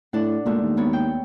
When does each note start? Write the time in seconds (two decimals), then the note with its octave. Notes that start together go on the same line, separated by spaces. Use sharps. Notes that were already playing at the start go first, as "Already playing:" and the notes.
0.13 A2 D4 F#5
0.46 A#2 G#3 A3 F#4
0.61 D#2
0.77 G#2 B3 C#5
0.93 G5